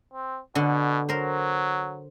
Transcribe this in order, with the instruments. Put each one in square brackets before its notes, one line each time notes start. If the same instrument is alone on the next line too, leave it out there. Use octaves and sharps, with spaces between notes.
[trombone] C4
[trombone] B2 [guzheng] D3
[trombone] F#3 [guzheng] A#4 C5